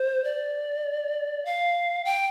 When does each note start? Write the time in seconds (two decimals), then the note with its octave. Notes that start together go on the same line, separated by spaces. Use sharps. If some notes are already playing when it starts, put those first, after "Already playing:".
Already playing: C5
0.24 D5
1.45 F5
2.05 G5